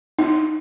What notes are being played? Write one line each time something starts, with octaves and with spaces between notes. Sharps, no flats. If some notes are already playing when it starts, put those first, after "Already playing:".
D#4